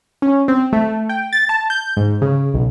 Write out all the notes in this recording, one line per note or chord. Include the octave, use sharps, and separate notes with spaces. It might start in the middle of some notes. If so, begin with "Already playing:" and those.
C#4
C4
A3
A3
G5
A6
A5
G6
G#2
C#3
B1